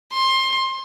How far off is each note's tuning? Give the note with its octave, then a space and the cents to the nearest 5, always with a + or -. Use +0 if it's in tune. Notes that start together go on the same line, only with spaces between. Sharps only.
C6 +20